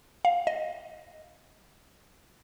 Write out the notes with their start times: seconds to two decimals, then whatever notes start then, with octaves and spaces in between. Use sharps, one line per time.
0.25 F5
0.47 D#5